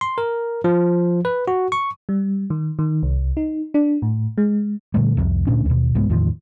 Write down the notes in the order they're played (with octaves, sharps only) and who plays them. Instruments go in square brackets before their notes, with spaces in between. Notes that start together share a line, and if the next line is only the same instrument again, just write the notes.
[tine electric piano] C6
A#4
F3
B4
F#4
C#6
[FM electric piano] G3
D#3
D#3
C2
D#4
D4
A2
G#3
[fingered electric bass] A#2 D3 G3 A3
C2 F2 C3
D2 A#2 C#4 D4
D#2 B2
C2 G#2 G#3 B3
E2 A2 D#3 F3